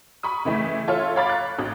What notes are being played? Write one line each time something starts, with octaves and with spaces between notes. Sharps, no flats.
B5 C#6 D#6
C#3 E3 A3
F4 A4 C#5 E5 C6 F6
C#5 F5 B5 D6 A6
F#6
A1